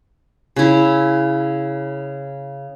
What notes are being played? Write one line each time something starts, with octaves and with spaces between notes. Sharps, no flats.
C#3 E4